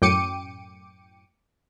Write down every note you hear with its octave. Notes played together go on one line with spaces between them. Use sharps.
F#2 A2 G5 D6 C#7 D#7